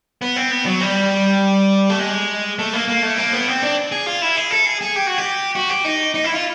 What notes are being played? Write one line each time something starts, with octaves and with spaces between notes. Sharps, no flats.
B3
C4
B3
F#3
G3
A3
G#3
A3
A#3
A#3
A3
A#3
B3
C4
D4
G#4
F4
E4
G#4
A4
G#4
G#4
G4
F#4
G4
F#4
G4
D#4
D#4
E4
F4